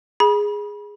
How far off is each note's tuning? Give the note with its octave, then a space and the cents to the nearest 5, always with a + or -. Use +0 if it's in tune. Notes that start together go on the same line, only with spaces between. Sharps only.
G#4 -5 B5 -30